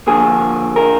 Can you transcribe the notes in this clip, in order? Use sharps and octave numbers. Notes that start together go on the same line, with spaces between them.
D3 F3 A#3 G#4
A#4